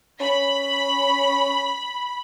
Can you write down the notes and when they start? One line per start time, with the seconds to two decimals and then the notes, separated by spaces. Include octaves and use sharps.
0.21 C#4 B5